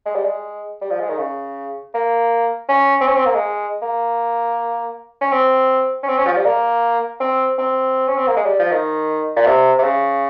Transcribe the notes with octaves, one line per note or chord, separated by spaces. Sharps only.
G#3
G3
G#3
G3
F3
G#3
D#3
C#3
A#3
C#4
C4
C#4
C4
A#3
G#3
A#3
C#4
C4
C#4
C4
C#4
F3
G3
A#3
C4
C4
C#4
C4
A#3
G#3
G3
F3
D#3
A#2
C3
C3
C#3